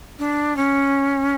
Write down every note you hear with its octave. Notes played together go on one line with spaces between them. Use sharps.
D4
C#4